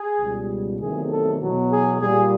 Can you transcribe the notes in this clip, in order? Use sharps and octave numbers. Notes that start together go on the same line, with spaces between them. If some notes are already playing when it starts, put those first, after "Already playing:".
Already playing: G#4
C#2 B2 G3
E2 C3 D#3 F#3 A3 G#4
A4
E2 B2 F#3
G#4
A#2 G3 G#4